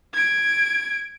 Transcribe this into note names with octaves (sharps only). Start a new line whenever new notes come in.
G#6 D7